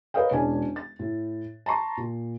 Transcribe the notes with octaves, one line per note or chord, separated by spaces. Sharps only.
A#4 B4 C#5 D#5 F5 G5
E1 G#3 C#4 D4 G#5
A6
A2
A5 A#5 C6 C#6
A#2